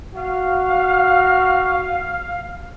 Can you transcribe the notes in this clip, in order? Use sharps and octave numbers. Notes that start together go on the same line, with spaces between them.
F#4 F5